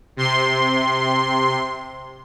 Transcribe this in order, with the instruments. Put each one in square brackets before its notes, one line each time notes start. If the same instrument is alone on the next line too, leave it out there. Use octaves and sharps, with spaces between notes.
[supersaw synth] C3 C6